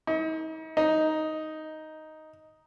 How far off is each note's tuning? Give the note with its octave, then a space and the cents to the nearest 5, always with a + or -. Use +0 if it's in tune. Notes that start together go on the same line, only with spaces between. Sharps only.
D#4 +40
D#4 +5